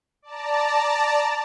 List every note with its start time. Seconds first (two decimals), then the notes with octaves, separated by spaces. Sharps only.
0.22 D5 A5 A#5